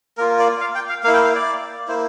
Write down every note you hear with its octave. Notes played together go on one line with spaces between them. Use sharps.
A#3 F4 A#4
D5
F5
G5
F5
A#3 E4 F5
G5
F5
D5
A#3 E4 C5